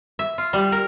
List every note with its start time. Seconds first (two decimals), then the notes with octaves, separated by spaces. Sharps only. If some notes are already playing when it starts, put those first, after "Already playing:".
0.19 E5
0.38 F4
0.53 G3
0.72 A#4